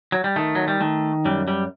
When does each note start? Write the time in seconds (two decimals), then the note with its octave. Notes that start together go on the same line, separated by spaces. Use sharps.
0.12 F#3
0.24 G3
0.36 D#3 A3
0.55 F#3
0.68 G3
0.80 D#3 A3
1.25 F#2 G3
1.48 G3